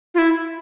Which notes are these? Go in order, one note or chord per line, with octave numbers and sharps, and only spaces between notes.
F4
E4